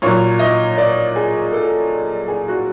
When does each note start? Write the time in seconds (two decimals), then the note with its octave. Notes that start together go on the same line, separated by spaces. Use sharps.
0.02 A#2 F#3 C#5
0.39 D#5
0.78 D5
1.16 G#4
1.53 A4
2.28 G#4
2.48 F#4